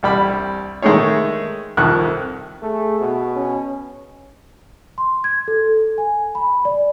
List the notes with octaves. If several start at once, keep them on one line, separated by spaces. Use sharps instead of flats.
C2 G3 B5
D#3 G#3 A3 D#4 G#4 C#5
C2 F2 D#3 C#6 F#6
A3 G#4
B2
C#4
C6
G#6
A4
G#5
B5
D5